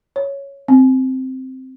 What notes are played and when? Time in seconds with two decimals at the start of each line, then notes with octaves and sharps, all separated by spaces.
0.16 C#5
0.68 C4